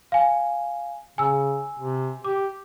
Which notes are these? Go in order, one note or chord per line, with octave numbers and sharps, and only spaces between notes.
F5 G#5
C#3 G#5 E6
C3
G4 D6